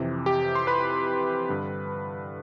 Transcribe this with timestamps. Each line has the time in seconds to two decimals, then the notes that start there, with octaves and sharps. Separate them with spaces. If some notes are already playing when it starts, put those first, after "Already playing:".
Already playing: F2 C3 E3
0.26 G4 G5
0.55 C6
0.67 B4 B5
1.49 G2 D3